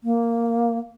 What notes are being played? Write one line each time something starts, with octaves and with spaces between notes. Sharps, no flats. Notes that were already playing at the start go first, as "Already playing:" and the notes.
A#3